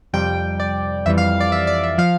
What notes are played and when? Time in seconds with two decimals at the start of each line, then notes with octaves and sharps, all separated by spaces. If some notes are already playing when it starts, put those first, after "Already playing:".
0.13 F2 C3 G3 G5
0.60 D5
1.06 F2 E3 G3 E5
1.18 F5
1.40 D5
1.52 E5
1.67 D5
1.84 E5
1.98 F3 F5